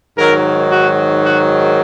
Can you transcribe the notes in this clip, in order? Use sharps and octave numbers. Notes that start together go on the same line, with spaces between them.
G#2 D#3 F#3 A#4
F#4
F#4